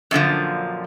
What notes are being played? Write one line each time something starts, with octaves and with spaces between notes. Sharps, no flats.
F#2 A#2 D3 F3